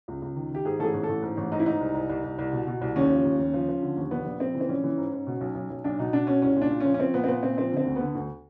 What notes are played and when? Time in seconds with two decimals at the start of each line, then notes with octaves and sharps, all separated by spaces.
0.08 C#2
0.22 C#2
0.36 D#3
0.51 D#3 G4
0.65 G#2 G#4
0.79 A1 A4
0.84 G#4
0.94 A1
1.03 A4
1.09 A1
1.22 G#2
1.37 A1
1.52 G#2 D#4
1.60 E4
1.66 G#2 D#4
1.81 C2
1.94 C2
2.09 C2
2.24 C2
2.38 C2
2.52 B2
2.67 B2
2.81 C2
2.96 D#2 C#4
3.10 F3
3.25 D#2
3.39 D#2
3.54 F3
3.69 F3
3.82 D3
3.97 D#2
4.11 A#1 B3
4.26 A#1
4.40 A#1 C4
4.55 E3
4.61 C4
4.68 A#1 C#4
4.84 E3
4.97 G#2
5.13 G#2
5.27 B2
5.41 B1
5.55 B1
5.70 B1
5.84 B1 D4
5.99 B2 D#4
6.13 B2 D4
6.27 B2 C#4
6.42 C2 C#4
6.56 A#2
6.61 D4
6.71 A#2
6.80 C#4
6.85 F3
6.94 C#4
6.99 F3 C4
7.14 A#2 B3
7.24 C4
7.28 A#2 B3
7.43 A#2 C4
7.57 F3 C4
7.72 D3 C4
7.86 D2
7.96 D3 B3
8.15 D2